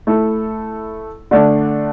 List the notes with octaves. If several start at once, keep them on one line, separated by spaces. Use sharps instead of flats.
A3 E4 A4
D3 A3 D4